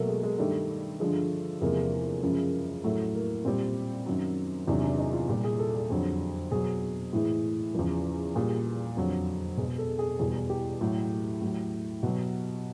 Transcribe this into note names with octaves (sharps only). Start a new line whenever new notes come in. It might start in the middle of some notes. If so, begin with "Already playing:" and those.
Already playing: B2 F#3 A3 A#3
G#3
G#3
G2 D#3 G3 A3
G2 D3 F3 G#3
E2 C3 F3 G#3 A#3
F#2 C#3 F3 G#3
A2 F#3 A3
A#3
A#2 G3 C4
F#2 D#3 F#3
E2 C3 D#3 F#3 D4
D4
D#4
F4
A#2 G3 G4
G#4
A4
G#4
F2 D3 F#3
B2 F#3 G#4
A2 E3 G#3
E2 C#3 F3
A#2 G3 G#4
F2 D3 F#3
B2 G#3 G#4
A4
G#4
E2 B2 G3 G#4
G4
A2 F#3
A2 F#3
B2 F#3 F#4